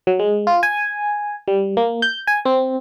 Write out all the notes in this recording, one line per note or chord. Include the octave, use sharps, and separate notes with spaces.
F#3
G#3
F4
G#5
G3
A#3
G6
G#5
C4